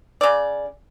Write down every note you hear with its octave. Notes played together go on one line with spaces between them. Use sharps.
C#3 D5